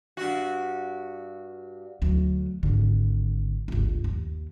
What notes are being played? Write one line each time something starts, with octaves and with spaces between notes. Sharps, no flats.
G2 F#4
D2 F#3
G#1 D3
G1 C#2
D#2